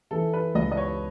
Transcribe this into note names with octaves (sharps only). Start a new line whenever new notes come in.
E3 A4
B4
C#2 D#5
D#5
C#5